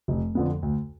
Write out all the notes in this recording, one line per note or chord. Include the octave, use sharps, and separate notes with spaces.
F1
F2 D3 F3 B3
D2